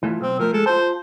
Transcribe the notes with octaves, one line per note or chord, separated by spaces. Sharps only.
E3 A3 F4
B1 C4
F3 A3 A#4
G#3 A4
F4 C5 A5